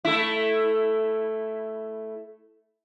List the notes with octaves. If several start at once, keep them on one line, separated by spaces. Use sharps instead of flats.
A3 E4